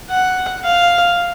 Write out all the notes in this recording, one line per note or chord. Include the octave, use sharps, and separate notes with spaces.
F#5
F5